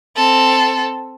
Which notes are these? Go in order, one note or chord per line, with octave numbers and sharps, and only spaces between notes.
C4 A4